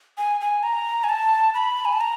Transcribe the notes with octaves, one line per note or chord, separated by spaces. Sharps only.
G#5
G#5
A#5
G#5
A5
B5
G#5
A5
A#5